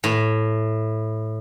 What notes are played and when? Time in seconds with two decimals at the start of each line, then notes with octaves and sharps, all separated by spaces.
0.04 A2